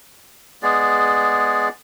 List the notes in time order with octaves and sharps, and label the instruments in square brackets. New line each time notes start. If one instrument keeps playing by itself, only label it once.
[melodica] G#3 B3 G#4 D5